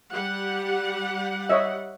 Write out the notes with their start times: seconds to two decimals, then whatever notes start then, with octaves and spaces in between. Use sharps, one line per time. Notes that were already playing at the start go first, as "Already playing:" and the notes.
0.11 G3 G4 F#5
1.49 C#5 D#5 E5